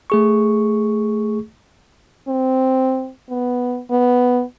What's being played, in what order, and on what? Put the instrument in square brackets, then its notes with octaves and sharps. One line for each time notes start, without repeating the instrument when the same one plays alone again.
[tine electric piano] A3 G#4 C#6
[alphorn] C4
B3
B3